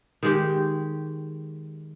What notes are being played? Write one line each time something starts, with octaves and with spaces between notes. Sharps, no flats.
D#3 G#3 G4